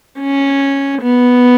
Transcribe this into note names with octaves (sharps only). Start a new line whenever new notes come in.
C#4
B3